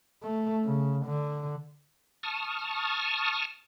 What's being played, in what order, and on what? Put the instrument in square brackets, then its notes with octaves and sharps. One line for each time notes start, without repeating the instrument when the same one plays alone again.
[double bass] A3
C#3
D3
[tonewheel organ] A5 C#6 D#6 F6